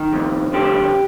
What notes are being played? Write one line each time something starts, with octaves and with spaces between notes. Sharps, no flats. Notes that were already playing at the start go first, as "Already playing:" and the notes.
Already playing: D#3
F2
D3 G4